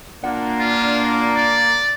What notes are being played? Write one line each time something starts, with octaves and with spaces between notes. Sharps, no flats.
A#2 A#3 D4 F#5
F4
D5